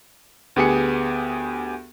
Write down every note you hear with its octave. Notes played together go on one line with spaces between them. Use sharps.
D2 B3 G4 G#4 G#5 C#7